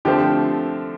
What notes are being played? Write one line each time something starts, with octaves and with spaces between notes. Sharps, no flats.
D3 F3 A3 C4 G4